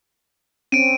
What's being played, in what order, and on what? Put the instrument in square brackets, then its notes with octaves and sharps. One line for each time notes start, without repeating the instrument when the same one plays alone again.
[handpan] C4 C#4 [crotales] D7 D#7